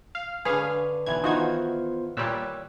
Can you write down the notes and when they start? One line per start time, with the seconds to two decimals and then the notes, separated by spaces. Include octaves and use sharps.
0.15 F5
0.45 D3 G#4 B4 C#5 F5
1.06 B1 E3 G#6
1.24 D#3 E3 B3 D#4 F4 F#4 C5 G#6
2.17 A#2 G3 C#5 E6 F#6